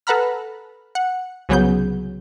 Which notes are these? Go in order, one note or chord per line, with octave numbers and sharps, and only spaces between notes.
A4 B4 F#5 A#5 B5 F6
F#5
C2 C#3 F#3 B3 G#4 G6